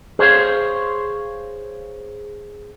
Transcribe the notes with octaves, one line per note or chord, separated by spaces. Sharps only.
G#4 C5 C#5 F5